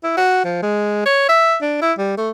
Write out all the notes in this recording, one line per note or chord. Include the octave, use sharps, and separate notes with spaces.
E4
F#4
F3
G#3
C#5
E5
D4
E4
G3
A3